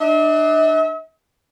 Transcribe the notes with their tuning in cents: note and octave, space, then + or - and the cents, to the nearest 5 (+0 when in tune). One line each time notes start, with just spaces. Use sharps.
D4 +30 E5 -45